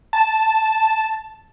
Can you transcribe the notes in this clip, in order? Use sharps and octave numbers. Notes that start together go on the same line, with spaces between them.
A5